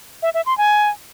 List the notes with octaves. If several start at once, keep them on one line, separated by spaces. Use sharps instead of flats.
E5
E5
C6
G#5